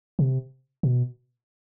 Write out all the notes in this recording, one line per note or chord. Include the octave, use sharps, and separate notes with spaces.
C3
B2